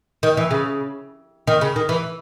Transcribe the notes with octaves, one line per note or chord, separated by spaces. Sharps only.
D#3
E3
C#3
D#3
C#3
D#3
E3